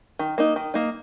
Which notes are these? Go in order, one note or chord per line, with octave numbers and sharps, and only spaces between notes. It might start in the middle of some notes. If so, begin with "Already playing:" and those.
D#3
A#3 D#4
D#3
A#3 D#4